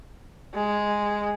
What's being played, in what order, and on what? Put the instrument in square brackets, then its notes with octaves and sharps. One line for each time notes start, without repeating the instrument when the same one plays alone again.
[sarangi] G#3